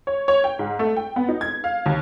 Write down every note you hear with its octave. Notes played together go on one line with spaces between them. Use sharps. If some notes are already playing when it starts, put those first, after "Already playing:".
C#5
C#5
G5
G#2
A3
G5
B3
D#4
G#6
F5
D#2